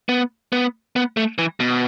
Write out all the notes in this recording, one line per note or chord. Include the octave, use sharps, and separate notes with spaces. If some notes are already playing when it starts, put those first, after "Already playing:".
B3
B3
B3
A3
E3
B2